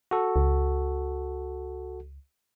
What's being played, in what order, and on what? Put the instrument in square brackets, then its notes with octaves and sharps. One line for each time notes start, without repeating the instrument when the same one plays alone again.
[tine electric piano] F#4 A4
[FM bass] C#2